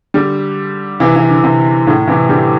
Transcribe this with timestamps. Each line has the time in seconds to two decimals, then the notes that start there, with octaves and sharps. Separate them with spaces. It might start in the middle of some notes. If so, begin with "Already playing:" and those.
0.14 D3 G3
1.00 C3 E3
1.16 E3
1.30 D3
1.44 C3
1.87 A2 D3
2.08 C3 E3
2.29 D3 G3